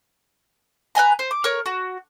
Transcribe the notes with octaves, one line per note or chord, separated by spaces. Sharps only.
B4 D#5 G#5 A#5
C5
D6
A#4 C#5
F#4